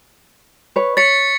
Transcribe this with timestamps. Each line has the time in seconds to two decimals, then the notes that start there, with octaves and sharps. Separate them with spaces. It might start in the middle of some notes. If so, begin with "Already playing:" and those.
0.76 B4 C#5
0.97 C#5 A6 B6 C#7